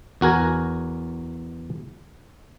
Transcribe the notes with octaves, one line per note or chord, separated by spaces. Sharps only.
E2 F#4 A#4 G#5